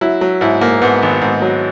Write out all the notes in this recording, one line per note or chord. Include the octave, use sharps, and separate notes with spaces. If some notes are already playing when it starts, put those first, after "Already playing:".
F#3 E4
F#3
G#2 E4
G#2 A#3
G#2 B3
G#1
G#2
F#3